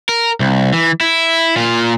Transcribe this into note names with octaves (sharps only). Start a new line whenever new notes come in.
A#4
C2
E3
E4
A#2 F4